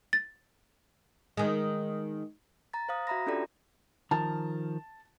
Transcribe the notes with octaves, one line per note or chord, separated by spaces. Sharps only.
A6
D#3 G#3
A#5 A6
C5 F5 D#6
F#4 E5 A#5 B5 A#6
C#4 D4 F4 G4 A4 D5
D#3 F3 A#4 A5